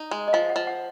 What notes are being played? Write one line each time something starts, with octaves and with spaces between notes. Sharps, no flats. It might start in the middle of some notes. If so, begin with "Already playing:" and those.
Already playing: D#4
G#3
D#5
F3 F5
F#5
F3
F#5